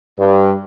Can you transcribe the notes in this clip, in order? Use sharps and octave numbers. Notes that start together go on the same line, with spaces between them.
G2